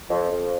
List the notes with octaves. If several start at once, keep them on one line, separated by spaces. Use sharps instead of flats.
F2
F2